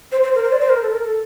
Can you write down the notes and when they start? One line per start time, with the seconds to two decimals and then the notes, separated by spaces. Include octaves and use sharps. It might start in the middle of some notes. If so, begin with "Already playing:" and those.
0.12 C5
0.23 C5
0.35 A#4
0.44 C5
0.52 D5
0.61 C5
0.69 A#4
0.82 A4
0.92 A#4
1.04 A4